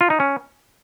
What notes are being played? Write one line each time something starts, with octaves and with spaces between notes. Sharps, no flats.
F4
D#4
C#4